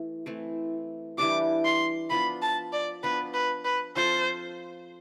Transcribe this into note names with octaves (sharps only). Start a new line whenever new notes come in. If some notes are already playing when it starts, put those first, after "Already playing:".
Already playing: E3 A3 E4
E3 A3 C4
E3 G3 D4 G4 D6
C6
F3 B3 D4 F4 B5
A5
D5
F3 B3 D4 B4
B4
B4
F3 C4 F4 A4 C5